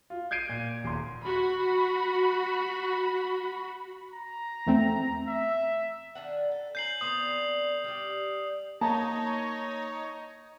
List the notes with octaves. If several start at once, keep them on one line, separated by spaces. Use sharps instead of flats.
F4
G6 G#6 C7 D7 D#7
A#2
D#1 C6
F#4 B5
A#5
E2 A3 C4
E5
D#3 D4 F#5
A4
C#4 D4 A#5 G6 C7 F#7
D3 B3 C4 D#6
G3 G4
A#3 D#4 C#5 D#5 A5 A#5